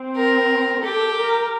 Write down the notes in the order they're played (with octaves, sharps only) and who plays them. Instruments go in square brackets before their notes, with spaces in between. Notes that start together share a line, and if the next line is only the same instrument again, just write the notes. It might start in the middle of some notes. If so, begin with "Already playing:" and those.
Already playing: [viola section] C4
[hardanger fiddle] A#4
[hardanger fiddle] G4 [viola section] A4
[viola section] A#4